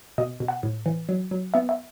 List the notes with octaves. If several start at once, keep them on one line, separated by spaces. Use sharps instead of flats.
B2 D#5
B2
F#5
A2
E3
F#3
F#3
B3 E5
E5